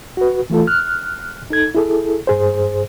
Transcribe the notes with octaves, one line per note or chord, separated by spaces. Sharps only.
F#4 B4
E3 A3 F4 A4
F6 F#6
D#4 A4 G#6
E4 G#4 A4
G2 G#4 C5